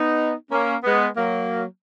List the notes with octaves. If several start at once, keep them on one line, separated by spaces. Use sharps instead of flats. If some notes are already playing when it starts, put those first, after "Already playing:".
Already playing: B3 D#4
A#3 C#4
G#3 B3
F#3 A#3